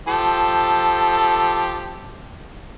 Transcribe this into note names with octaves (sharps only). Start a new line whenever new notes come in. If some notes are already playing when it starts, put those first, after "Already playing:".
F3 G4 A4